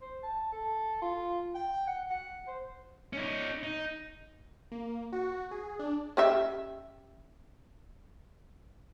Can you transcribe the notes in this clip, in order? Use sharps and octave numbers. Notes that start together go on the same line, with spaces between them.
C5
A5
A4
F4
G5
F#5
F#5
C5
C#4 D#4
D#4
A#3
F#4
G#4
D4
C#4 G4 E5